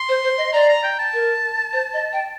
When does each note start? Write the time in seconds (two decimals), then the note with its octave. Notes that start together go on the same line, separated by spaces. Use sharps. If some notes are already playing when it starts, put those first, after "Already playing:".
Already playing: C6
0.09 C5
0.24 C5
0.38 D#5
0.53 D5 A#5
0.69 A#5
0.83 G5
0.99 A5
1.14 A#4
1.73 C5
1.94 D#5
2.13 G5